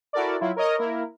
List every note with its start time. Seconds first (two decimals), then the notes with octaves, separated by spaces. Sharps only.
0.13 E4 F#4 A4 A#4 D5
0.40 F#3 E4 F4
0.56 A#4 C#5 D#5
0.78 A#3 E4 A#4